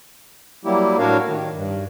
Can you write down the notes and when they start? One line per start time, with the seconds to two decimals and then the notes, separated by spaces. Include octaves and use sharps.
0.65 F#3 G3 A#3 E4 G4
0.98 A2 D4 F#4 A#4 C#5 F5
1.28 D#3
1.54 G2